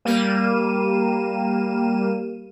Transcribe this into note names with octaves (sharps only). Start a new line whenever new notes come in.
G3 A#3 F5 D#7 E7